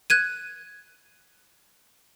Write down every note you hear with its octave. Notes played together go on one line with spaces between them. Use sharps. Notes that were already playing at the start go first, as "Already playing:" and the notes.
F#6 G#6 D#7